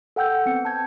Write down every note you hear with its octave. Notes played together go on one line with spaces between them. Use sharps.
A4 F#5 G5 E6 G6
B3 C4 C#7
A5 G6 G#6